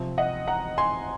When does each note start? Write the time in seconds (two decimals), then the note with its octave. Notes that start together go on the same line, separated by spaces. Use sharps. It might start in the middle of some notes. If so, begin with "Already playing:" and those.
Already playing: C3 F3 C4
0.18 D#5 F#5
0.48 F#5 A#5
0.78 G#5 C6